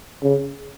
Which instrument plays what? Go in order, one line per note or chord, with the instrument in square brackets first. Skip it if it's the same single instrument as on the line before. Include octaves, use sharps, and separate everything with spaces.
[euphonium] C#3